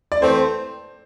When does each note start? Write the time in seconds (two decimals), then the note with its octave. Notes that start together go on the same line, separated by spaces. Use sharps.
0.12 D5
0.22 E3 A3 C4 C5